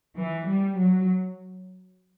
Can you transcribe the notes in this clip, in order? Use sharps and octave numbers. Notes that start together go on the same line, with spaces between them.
E3
G3
F#3